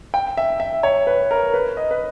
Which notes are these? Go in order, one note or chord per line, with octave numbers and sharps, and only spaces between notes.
G5
E5
E5
C#5
B4
A#4
B4
D#5
B4